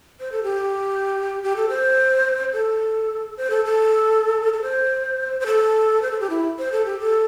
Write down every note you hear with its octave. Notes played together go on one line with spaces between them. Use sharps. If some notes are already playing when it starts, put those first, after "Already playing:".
C5
A4
G4
G4
A4
C5
A4
C5
A4
A4
A4
C5
C5
A4
C5
A4
G4
E4
C5
A4
G4
A4